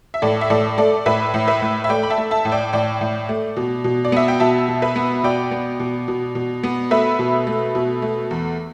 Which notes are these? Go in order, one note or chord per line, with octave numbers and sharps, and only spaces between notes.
E5
A2 A4 D5
E5
A2 A4 D5
A3 A4 D5
A2 B4 E5
A2
B4 E5
A2
E5
A3 D5 G5
B5
E5 A5
A3
E5 A5
A2
D5 G5
A2 D5 G5
A2
A3
B2
B2
D5
B3 E5
G5
B2 E5 A5
B2
B4 E5
B3
B2 D5 G5
B3
B2
B2
B2
B3
A3 B4 E5
B2
A3
B2
A3
E2